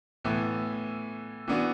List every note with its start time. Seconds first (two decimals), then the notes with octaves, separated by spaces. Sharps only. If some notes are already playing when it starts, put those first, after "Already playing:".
0.24 A2 E3 B3 E4
1.48 E3 B3 D4 F#4